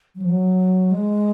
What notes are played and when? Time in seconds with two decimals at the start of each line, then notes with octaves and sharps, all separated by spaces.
0.15 F#3
0.22 F3
0.29 F#3
0.91 G#3